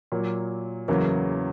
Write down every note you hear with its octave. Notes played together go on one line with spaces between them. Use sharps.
A#2 F#3 A#3
E2 C#3 F#3 A#3